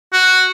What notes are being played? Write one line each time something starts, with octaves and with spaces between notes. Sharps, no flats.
F#4